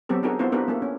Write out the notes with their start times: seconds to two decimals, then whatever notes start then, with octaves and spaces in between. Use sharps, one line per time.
0.09 F#3 B3 C4 G4 A4
0.23 D4 D#4 F#4 G#4 A#4
0.39 B3 C4 E4 F4 C5
0.52 B3 D4 D#4 G4 A#4 B4
0.68 A3 A#3
0.82 C#4